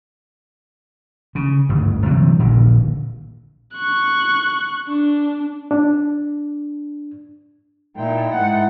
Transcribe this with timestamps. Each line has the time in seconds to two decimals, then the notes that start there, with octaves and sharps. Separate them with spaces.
1.35 C#3
1.69 G1 D2 G#2
2.05 C3 E3 F#3 G3
2.39 D#1 A#1 A#2 D3
3.74 C#6 F#6
4.87 D4
5.71 D4
7.97 A#2 D#4 E4 G5
8.34 G#2 F#5